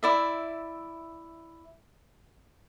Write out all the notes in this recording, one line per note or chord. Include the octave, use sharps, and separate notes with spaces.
E4 D5 E5